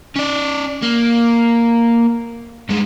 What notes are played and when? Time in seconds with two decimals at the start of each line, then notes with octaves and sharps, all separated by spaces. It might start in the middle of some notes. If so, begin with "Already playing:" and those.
0.16 C#4 D5
0.82 A#3
2.69 G2 G#3